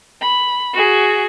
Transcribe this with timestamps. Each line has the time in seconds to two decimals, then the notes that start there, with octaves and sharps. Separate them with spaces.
0.21 B5
0.73 F#4 G#4